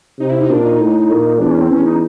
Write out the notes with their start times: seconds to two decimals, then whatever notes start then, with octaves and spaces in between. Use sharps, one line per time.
0.19 C3 D#4
0.30 E4
0.40 D#4
0.50 A#2 D4
0.65 D#4
0.81 A2
1.11 A#2
1.40 E2 D4
1.51 C#4
1.61 C4
1.71 E2 C#4
1.86 D#4